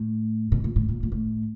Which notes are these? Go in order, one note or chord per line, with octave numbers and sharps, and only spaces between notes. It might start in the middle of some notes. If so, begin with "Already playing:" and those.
Already playing: A2
B2
A#2
A2
A#2
A#2
A2